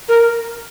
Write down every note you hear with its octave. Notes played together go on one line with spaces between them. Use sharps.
A#4